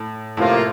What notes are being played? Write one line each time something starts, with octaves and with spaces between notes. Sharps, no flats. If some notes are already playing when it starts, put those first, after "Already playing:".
Already playing: A2
A2 C3 F3 A#3 F4